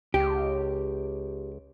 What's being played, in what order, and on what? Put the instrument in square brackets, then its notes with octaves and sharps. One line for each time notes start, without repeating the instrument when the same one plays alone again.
[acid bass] C#2 [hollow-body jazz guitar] G4